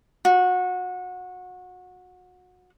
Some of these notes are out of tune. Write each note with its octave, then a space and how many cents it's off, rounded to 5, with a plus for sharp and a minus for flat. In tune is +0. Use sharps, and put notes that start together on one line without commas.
F#4 -25